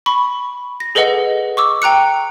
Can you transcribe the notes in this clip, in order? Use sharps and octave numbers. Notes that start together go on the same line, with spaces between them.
B5 C#6
A#6
G#4 A4 B4 D#5 F#5
C#6 D6 E6
G5 A#5 F#6 C#7